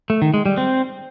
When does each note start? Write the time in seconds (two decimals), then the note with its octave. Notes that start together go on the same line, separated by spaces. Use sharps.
0.10 A3
0.22 D#3
0.34 G#3
0.46 G3
0.57 C4